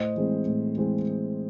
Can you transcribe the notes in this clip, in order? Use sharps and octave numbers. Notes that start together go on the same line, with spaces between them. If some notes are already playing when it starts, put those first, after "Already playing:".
Already playing: A2 C5 D#5
E3 G#3 C4
A2
E3 G#3 C4